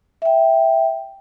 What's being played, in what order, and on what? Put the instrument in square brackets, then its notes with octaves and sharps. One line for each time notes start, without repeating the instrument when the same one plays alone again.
[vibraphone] E5 G5